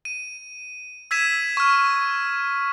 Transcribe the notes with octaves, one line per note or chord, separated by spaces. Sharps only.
D#7
E6 G#6 B6 D#7 E7
C#6 F6